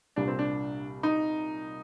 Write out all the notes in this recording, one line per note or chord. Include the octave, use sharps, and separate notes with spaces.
C2 A#2 G3 D4
C4
D4
D#4